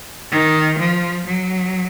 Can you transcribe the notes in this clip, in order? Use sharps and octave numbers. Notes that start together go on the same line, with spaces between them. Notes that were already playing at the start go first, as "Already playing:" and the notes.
D#3
F3
F#3